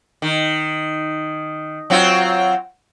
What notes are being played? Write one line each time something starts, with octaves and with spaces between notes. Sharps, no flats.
D#3
F#3 C4 F4